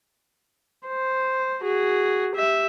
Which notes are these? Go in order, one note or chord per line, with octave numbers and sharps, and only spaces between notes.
C5
F#4 G#4
G4 E5